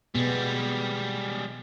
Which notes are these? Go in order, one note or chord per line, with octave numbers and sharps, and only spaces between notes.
B2 G3 G#3 B3